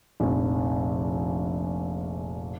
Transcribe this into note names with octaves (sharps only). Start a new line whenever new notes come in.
F1 A#1